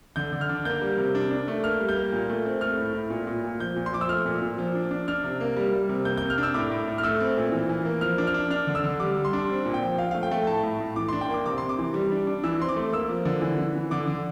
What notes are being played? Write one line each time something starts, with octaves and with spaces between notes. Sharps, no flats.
D3 G6
D3
F6
D4
A#3 G6
G3
C3
D4
D4
A3
A#3 F6
G3
G6
A#3
A#2
A3
C4
A3 F6
A2
A2
A#2
A#2
A#2
F3 G6
A#2
C6
F3 D6
E6
A3 F6
A#2
A#2
F3
D4
D4
D4 F6
C3
A#3
G3
G3
C3
A#3 G6
C3 G6
F6
D4
E6
A2 D6
A2
A2
F6
A3 E6
C4
A#2
E3
E3
A#3
F3 F6
D4
F6
D4
D4 F6
D3
E6
D3
G3 D6
G3
C6
D4
C4
A#2
G5
F3
F3 F5
A3 F5
G5
A3
A2 A5
A2
A2
E3 D6
D4 C6
G5
A#3
D6
C3 D6
C3 C6
D6
E3
G3
D4
D4
E3 E6
C4 C6
D6
A3
A#3 E6
F3
D3
E3
E3
E3
D3 D6
D3